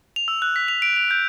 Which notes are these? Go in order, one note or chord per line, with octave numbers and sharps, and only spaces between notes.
F7
E6
F#6
B6
F7
D7
F7
G6